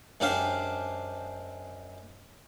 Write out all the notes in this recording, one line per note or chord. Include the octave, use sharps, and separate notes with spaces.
F#2 G#3 D4 G4 C5 F5